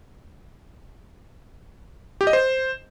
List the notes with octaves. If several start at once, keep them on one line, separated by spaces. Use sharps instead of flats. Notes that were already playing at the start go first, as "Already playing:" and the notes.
G4
D#5
C5